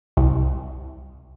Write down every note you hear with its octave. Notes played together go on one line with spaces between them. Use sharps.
C2